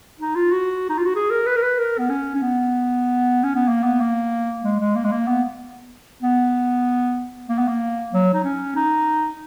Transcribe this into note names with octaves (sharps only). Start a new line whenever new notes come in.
D#4
F4
F#4
D#4
F4
F#4
G#4
A#4
B4
A#4
B4
A#4
B3
C#4
C#4
B3
C#4
B3
A#3
B3
A#3
G#3
G#3
A#3
G#3
A#3
B3
B3
A#3
B3
A#3
F#3
D#4
C#4
D#4